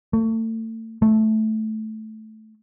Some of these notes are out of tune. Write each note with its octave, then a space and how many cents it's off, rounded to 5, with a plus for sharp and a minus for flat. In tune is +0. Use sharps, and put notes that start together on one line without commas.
A3 +35
A3 -10